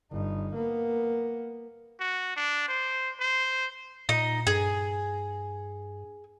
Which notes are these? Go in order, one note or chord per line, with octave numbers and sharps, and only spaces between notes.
G1 D#4
A#3 B3
F#4
D4
C5
C5
A#2 D#4
G2 G#4